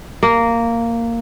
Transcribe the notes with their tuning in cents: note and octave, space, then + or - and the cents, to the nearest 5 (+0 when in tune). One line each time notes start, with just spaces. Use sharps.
A#3 -10